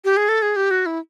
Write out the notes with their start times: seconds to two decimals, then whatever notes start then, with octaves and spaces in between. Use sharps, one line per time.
0.05 G4
0.17 G#4
0.29 A4
0.42 G#4
0.56 G4
0.71 F#4
0.86 E4